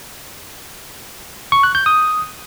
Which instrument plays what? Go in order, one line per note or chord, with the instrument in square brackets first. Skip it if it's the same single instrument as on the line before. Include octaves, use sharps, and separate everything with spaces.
[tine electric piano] C#6
F#6
G6
D#6